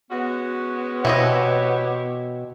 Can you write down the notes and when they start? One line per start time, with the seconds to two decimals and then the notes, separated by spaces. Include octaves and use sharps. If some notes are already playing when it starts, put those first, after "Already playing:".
0.11 G#3 B3 C#4 F#4
1.05 B2 E3 C4 E4 G4 C#5 D#5